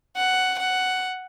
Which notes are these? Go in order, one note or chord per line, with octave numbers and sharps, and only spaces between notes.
F#5
F#5